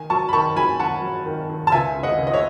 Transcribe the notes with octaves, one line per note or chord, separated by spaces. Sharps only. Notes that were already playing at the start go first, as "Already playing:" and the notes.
Already playing: D#3 G#5
F#3 A5 C#6
B5
D#3 A5 C#6
F#3 G#5 B5
D#3 F#5 A5
F#3
D#3
D#3
A5
C#2 E5 G#5
C#2
D#5 F#5
C#2
D#5
C#5 E5